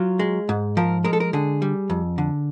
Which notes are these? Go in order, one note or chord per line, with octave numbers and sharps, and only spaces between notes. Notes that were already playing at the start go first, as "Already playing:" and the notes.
Already playing: F#3 F4
G#3
G#2
F3 A#4
G#3 A#4
A4
A#4
D3 G#4
G3
F2
D3